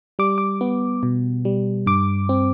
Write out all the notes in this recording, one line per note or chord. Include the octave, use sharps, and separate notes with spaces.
G3 D6
D6
B3
B2
G3
G2 D6
C4